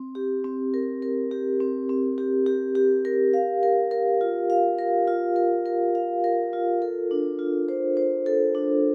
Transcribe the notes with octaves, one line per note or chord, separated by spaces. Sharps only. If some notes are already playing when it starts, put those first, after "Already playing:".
Already playing: C4
G4
C4
A#4
A#4
G4
C4
C4
G4
G4
G4
A#4
F5
A#4
A#4
F4
F5
A#4
F4
A#4
A#4
F5
A#4
F4
A4
D4
F4
C5
C5
A4
D4